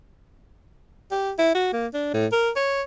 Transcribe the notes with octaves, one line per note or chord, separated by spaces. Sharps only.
G4
E4
F#4
A#3
D4
A2
A#4
C#5